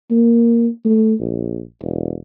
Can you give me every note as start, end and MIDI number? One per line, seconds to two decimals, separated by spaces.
0.11 0.68 58
0.85 1.14 57
1.20 1.62 34
1.82 2.17 28